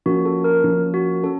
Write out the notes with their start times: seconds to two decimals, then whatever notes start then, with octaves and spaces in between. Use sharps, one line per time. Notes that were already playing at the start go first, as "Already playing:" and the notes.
0.06 F3 A#3 C#4 F#4
0.25 A4
0.44 A#4
0.64 F3 A#3 C#4
0.94 F#4
1.23 C#4 A4